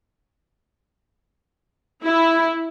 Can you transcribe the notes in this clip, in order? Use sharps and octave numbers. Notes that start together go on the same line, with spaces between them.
E4